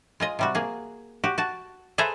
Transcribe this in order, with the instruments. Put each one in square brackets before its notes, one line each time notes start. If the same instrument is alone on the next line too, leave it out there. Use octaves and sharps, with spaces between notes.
[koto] G#3 F4 D#5
C3 G3 F#4
A#3 G#4
F#4 G4
F#4 A5
G#4 A4 B4 C5 E5 A#5